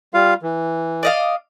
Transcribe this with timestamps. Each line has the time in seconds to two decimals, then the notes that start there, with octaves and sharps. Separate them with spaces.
0.14 G3 F4 F5
0.42 E3
1.03 D5 D#5 F5